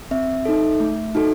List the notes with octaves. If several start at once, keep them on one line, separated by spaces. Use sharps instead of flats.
C4 E5
D#4 A4
A3
D#4 F#4 A4